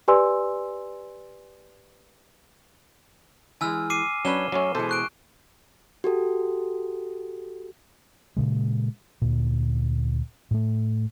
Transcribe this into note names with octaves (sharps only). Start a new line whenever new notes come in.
G4 B4 D5 G#5 C6 E6
E3 G#3 G#5 E6 F6
D6 C7 D#7
F#3 C#4 D4 B4 C#5 E7 G7
F#2 F#3 A3 C#4
B2 E3 G#3 A4 C5
C#6 F#6 D7
F#4 G4 A4
A#2 C#3 G#3
D2 A#2
A2 A3